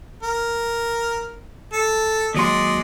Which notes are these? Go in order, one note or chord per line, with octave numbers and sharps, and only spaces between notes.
A#4
A4
D#2 F#3 G#3 D5 D#5 C6